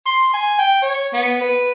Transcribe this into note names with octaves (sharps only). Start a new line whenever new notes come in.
C6
G#5
G5
C#5
B3
B4